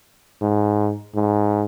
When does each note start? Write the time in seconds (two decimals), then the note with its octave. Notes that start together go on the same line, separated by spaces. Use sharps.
0.42 G#2
1.15 G#2